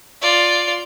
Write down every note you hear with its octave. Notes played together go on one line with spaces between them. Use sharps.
F4 D5